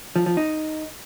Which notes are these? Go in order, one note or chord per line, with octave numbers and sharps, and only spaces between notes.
F3
F3
D#4